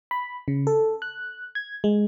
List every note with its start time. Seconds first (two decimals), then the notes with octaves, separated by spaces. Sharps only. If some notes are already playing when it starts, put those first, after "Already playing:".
0.11 B5
0.48 C#3
0.67 A4
1.02 F#6
1.55 G#6
1.84 G#3